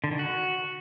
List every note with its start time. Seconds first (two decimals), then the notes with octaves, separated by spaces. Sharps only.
0.04 D3
0.11 D#3
0.19 F#4